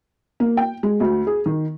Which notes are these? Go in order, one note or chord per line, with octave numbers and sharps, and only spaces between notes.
A#3
G5
G#3
D2
G#4
D#3